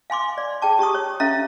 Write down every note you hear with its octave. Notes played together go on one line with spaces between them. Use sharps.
F5 G#5 C6 D6
D5
G#4 G5 A5 D6
G4 A#5 C#6 D#6
C#5
C#4 A4 E5 F5 A#5